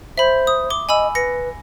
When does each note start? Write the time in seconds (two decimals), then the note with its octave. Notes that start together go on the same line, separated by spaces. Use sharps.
0.18 C5 E5 B5
0.47 D#6
0.70 D6 G7
0.89 D#5 G#5 B5 E6
1.15 B4 A#6 C#7